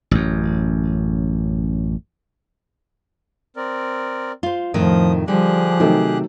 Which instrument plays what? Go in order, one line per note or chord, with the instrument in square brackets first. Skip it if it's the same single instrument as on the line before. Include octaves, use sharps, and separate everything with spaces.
[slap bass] A1 F#2
[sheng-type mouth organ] C4 A#4 D5
[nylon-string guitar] F4 C5
[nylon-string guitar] F2 A2 D#3 [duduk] F3 [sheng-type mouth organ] D#6
[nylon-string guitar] D3 G3 [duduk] F3 [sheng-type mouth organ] G4 G#4 F#6
[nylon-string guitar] C3 [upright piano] D#3 F#3 A3